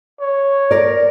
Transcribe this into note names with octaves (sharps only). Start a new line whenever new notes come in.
C#5
A#4 D5